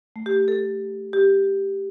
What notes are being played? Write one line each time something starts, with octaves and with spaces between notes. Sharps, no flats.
A3
G4
G4
A4
G4